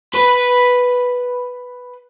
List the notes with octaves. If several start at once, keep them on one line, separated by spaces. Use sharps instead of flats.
B4 B5